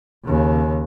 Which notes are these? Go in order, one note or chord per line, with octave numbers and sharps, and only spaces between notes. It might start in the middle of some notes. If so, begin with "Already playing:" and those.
D#2 C#3